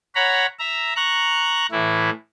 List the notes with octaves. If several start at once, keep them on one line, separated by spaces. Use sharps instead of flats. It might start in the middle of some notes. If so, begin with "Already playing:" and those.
C#5 F#5 A#5 B5
E5 A#5
A#5 C#6 F#6
A2 E3 E4